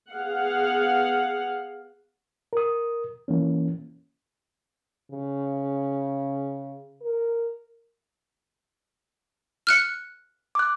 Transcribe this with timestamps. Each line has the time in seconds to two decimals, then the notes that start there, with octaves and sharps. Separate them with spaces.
0.11 B3 G#4 F5 F#5
2.53 A#4 D#6
3.28 E3 A#3 C#4
5.12 C#3
7.01 A#4
9.67 F6 F#6 C#7
10.55 D6 F#6